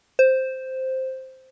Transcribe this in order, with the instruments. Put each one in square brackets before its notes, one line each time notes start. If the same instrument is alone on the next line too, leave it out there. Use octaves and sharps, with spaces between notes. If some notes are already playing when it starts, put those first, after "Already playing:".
[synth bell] C5